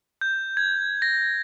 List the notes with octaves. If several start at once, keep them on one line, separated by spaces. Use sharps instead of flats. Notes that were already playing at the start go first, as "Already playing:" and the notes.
G6
G#6
A#6